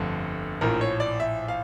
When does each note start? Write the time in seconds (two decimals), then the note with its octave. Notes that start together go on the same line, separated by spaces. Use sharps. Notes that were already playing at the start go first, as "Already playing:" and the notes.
Already playing: G1 F2 D3 A3
0.61 A#1 A2 F3 A#4
0.81 C#5
1.00 D5
1.20 E5
1.48 F5